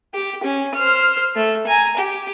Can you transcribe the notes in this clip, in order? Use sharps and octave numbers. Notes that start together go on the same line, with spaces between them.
G4
C#4
C5 F6
A3
G#5 A#5
G4